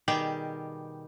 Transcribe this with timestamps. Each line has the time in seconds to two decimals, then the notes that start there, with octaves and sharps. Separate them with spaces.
0.08 B2 D#3 G3 G4 G#4 G5